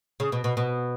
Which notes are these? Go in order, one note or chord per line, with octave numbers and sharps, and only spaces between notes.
C#3
B2
B2
B2